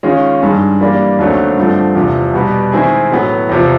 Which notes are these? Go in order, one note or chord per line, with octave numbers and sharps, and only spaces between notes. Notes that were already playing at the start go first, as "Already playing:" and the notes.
D#3 G#3 C#4 F4
G2 D#3 G#3
E3 G3 A#3 D4
D#2 D3 F#3 A3 C4
G2 D3 F3 A3 C4
E2 C3 F3
B2 G3 B3
D#3 G#3 C4 E4 G#4
A2 F#3 B3
E2 C3 F3